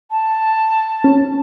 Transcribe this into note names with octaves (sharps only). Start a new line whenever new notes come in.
A5
C#4